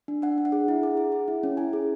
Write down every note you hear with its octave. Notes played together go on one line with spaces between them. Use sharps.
D4
D4 F#5
D4
F#5
G#4
E4
G#4
G#4
G#4
E4
C#4
E4 G#5
G#4